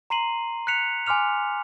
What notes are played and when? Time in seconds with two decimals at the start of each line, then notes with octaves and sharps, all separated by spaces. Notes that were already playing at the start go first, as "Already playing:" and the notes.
0.10 A#5 C6 C7 D#7 F#7
0.67 F#6 B6 C#7 F7
1.06 G#5 C6 D6 F6 F7